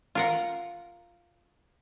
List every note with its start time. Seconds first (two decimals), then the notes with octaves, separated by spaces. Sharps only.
0.15 F4 A#4 F#5